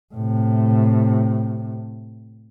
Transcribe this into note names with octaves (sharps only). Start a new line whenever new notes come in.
A2 C3